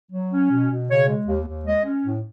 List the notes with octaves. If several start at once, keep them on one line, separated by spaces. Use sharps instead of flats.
F#3
C#4
B2
B2
C#3 C#5
G#3
D#2
D#2
G#3 D#5
C#4
A2